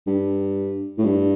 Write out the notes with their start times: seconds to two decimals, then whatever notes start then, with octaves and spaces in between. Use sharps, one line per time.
0.07 G2
0.98 A2
1.05 G2